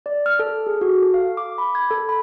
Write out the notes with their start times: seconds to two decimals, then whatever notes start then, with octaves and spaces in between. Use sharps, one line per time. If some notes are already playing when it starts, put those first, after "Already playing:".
0.06 D5
0.26 F6
0.39 A4
0.67 G#4
0.81 F#4
1.02 A4
1.14 F5
1.37 D6
1.58 B5
1.75 G#6
1.91 A4
2.09 B5